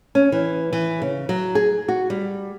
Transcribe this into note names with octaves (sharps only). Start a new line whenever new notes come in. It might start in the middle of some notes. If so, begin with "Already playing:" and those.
C#4
E3
E3
C#3
F#3
G#4
F#4
G3